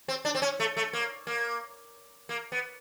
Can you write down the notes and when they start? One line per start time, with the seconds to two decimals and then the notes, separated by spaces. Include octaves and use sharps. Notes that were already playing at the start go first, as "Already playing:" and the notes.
0.08 C4
0.25 D4
0.35 C4
0.42 C#4
0.60 A3
0.77 A3
0.93 A#3
1.27 A#3
2.29 A#3
2.52 B3